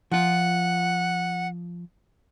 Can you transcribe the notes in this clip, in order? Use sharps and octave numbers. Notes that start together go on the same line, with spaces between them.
F3 F4 F#5